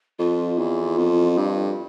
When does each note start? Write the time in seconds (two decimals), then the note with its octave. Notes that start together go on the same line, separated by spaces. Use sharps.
0.19 F2 F4
0.58 E2
0.98 F2
1.38 G2